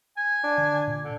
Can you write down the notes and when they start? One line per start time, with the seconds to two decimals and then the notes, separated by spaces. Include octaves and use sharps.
0.16 G#5
0.43 D4
0.58 D3
0.88 A#2
1.03 D3